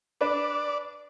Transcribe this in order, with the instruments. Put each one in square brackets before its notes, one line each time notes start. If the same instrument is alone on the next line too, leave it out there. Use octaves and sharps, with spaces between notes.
[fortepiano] D4 B4 [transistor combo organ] D5